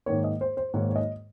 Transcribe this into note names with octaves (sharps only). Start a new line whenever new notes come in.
G#2 D#3 A#3 C#5
D#5
C5
C5
G#2 D#3 A#3 C#5
C#5
D#5